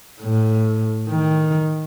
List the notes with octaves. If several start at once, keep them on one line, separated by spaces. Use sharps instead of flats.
A2
D#3